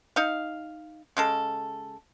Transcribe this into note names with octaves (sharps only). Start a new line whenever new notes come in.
D#4 F5
C#3 G#3 A4